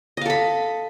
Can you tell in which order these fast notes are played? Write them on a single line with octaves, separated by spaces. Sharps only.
D#5 F5 A4 B5